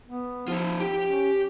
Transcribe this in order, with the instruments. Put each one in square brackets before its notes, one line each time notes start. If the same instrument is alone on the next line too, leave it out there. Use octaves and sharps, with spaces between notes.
[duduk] B3
[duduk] F3 [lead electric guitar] D#4 F4
[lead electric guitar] G4 G5
[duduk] C#4